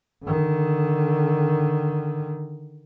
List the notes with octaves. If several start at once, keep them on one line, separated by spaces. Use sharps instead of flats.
D3 D#3